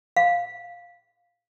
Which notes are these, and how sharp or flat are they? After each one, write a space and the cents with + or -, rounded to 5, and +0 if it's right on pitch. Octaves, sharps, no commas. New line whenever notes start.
F5 +5